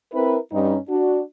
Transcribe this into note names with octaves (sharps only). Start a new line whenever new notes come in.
C4 E4 A#4 B4
G2 G3 C#4 D#4
D4 F#4